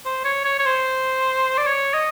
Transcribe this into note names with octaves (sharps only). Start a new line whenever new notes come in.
C5
C#5
C#5
C#5
C5
D5
C#5
D#5